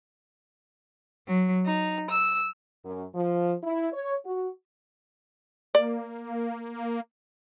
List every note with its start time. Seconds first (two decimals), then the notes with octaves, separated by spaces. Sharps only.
1.29 F#3
1.65 D#4
2.10 E6
2.85 F#2
3.15 F3
3.63 E4
3.93 C#5
4.26 F#4
5.75 A#3 D5